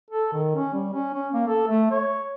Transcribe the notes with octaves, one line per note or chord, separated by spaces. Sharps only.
A4
D#3
C#4
G3
C#4
C#4
A#3
A4
A3
C#5